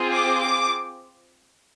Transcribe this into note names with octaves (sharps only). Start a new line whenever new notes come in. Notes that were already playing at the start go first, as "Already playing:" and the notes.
Already playing: C4 F4 G#4
D6
D6